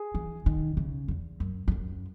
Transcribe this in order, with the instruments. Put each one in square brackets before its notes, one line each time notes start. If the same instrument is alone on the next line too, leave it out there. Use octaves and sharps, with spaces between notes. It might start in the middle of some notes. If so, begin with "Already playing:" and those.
Already playing: [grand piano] G#4
[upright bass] E3
D#3
C#3
E2
F#2
E2
F#2